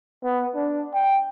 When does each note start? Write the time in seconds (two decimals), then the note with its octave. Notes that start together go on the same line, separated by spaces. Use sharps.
0.24 B3
0.55 D4
0.94 G5